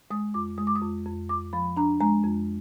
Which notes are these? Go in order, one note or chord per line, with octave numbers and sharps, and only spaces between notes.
G#3 D#6
F2 D6
G#3 D#6
D6
D#6
F2
F2
F2 D6
F3 B5
D4 A#5
G#3 A#5
F2